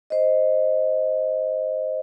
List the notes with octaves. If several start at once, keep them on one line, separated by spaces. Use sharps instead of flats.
C5 D#5